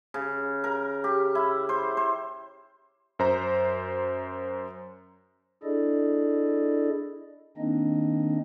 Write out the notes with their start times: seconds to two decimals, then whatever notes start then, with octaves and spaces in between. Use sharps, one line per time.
0.14 C#3
0.64 A#4
1.04 G4
1.35 E4
1.69 C5
1.97 C5
3.19 F#2 C5 A#5
5.63 D4 E4 G#4 A4 D5 D#5
7.57 D#3 A#3 C4 D4 D#4 D#5